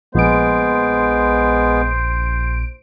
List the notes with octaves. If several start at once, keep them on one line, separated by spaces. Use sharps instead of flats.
A#1 G#3 B3 C5 D7